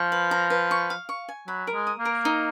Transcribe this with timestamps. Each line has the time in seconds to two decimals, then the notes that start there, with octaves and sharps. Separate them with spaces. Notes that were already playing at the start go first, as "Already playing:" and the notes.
Already playing: F3 C#6
0.12 B4
0.31 A#5
0.50 B4
0.71 C#6
0.90 F5
1.09 C#6
1.29 G#5
1.48 F#3 B5
1.67 A#4
1.74 G#3
1.87 D#6
1.99 A#3
2.05 A#4
2.25 D#4